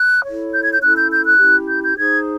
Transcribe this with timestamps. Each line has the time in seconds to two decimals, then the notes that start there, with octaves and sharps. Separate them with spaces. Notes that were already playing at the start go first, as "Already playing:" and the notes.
Already playing: F#6
0.24 E4 A4 C#5
0.53 G6
0.62 G#6
0.72 G6
0.82 C#4 E4 A4 F#6
0.97 G6
1.11 G6
1.25 F#6
1.39 C#4 E4 G4
1.68 G6
1.83 G6
1.96 D#4 G#4 C5 G#6